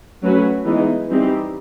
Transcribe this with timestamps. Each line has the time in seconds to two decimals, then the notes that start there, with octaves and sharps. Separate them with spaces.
0.22 F#3 A3 C#4 F#4 B4
0.64 E3 G#3 B3 D#4
1.08 E3 G3 C4 D#4 G4